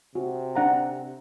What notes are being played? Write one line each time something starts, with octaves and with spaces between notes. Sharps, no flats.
C3 F#4
D4 F#5 A#5